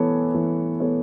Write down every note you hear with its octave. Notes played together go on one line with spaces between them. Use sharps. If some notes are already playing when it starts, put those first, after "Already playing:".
Already playing: E3 B3 A4 C#5
E3
B3 A4 C#5